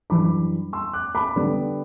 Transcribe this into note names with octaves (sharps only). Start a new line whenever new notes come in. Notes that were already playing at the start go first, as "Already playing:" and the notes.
F#2 E3 G3 D4 B5 D6
C6 E6
D6 F#6
B5 D6
D3 G3 B3 D4